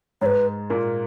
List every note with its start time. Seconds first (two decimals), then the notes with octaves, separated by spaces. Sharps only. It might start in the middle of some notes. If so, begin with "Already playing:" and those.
0.21 G#2 G#3 C#5
0.26 B4
0.70 A#2 A#3